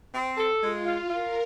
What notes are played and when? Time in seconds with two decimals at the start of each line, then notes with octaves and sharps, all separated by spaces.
0.13 C4
0.38 A4
0.62 G#3 F4
0.86 F4
1.10 F4 A#4